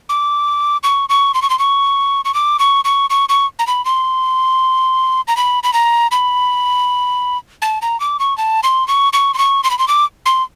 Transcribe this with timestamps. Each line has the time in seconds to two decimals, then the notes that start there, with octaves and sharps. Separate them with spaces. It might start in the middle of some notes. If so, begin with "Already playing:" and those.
0.09 D6
0.83 C#6
1.09 C#6
1.34 C6
1.42 C#6
1.50 C6
1.59 C#6
2.25 C#6
2.34 D6
2.59 C#6
2.85 C#6
3.10 C#6
3.29 C#6
3.59 A#5
3.67 B5
3.85 C6
5.28 A#5
5.37 B5
5.63 B5
5.73 A#5
6.11 B5
7.62 A5
7.82 A#5
8.00 D6
8.20 C#6
8.38 A5
8.63 C6
8.88 C#6
9.13 C#6
9.34 C6
9.38 C#6
9.64 C6
9.71 B5
9.79 C6
9.88 D6
10.26 C6